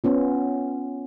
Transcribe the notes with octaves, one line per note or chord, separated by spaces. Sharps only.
B3 C#4 F4